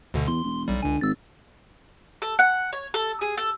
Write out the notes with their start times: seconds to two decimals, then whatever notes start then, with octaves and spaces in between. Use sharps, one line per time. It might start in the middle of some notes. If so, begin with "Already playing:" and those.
0.14 D2 B2 D3
0.28 E2 C6
0.44 E1
0.68 B1 G3
0.82 C#2 D3 G#5
1.01 G#1 E6 A6
2.22 A4
2.39 F#5
2.73 C#5
2.94 A4
3.21 G#4
3.37 A4